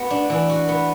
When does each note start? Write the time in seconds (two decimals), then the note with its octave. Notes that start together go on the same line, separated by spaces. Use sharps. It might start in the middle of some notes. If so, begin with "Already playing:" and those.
Already playing: B3 F#4
0.10 D4
0.30 E3
0.49 F#4
0.69 B3